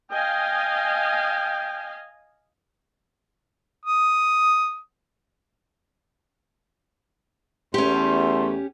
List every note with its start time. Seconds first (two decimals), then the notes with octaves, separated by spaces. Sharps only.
0.11 D#5 F5 G5 G#5
3.86 D#6
7.74 E2 A3 C#4 G4 C6